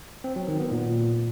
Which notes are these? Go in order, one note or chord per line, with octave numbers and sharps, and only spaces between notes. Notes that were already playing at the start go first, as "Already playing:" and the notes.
C4
F#3
D#3
B3
A#2